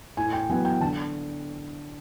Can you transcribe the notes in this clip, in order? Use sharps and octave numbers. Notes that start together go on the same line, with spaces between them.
A2 G#5
G5
F#3 B3 G#5
G5
D3 A5